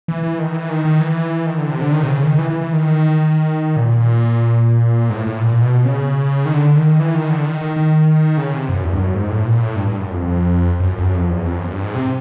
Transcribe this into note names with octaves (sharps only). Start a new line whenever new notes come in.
E3
E3
D#3
E3
D#3
D#3
E3
D#3
D3
C3
D3
D#3
C3
C#3
D#3
D#3
E3
E3
E3
D#3
A#2
A#2
G#2
A2
A2
A#2
A#2
B2
C#3
D#3
D3
D#3
E3
D#3
D3
D#3
D#3
D#3
C#3
C3
F#2
E2
G2
F#2
G#2
A2
A#2
A2
G2
G2
F#2
F2
F2
F#2
F2
F#2
F2
E2
F2
F#2
G2
G#2
C3